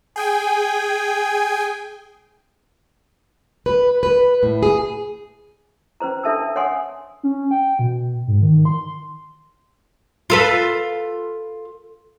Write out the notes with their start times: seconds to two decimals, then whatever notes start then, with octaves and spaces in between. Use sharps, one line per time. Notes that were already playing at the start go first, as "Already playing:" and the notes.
0.16 G#4 G5 G#5
3.66 B4
4.03 B4
4.43 A2
4.63 G#4
6.00 C#4 B4 C5 A#5
6.24 D4 A4 E5 A5 E6
6.56 C#5 F#5 G#5 C6 D#6
7.23 C#4
7.51 G5
7.79 B2
8.27 G#2
8.42 D#3
8.65 C6
10.30 F4 A4 B4